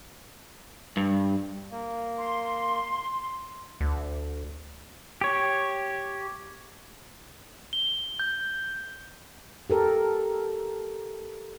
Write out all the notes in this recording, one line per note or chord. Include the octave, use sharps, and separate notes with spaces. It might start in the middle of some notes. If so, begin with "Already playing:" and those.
G2
A#3
C6
D2
G4 C#5
G7
G6
G4 A4 A#4